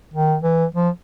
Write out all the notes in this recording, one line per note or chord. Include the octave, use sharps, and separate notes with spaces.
D#3
E3
F3